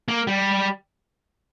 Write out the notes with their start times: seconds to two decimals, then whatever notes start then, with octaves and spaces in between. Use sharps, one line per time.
0.08 A#3
0.27 G3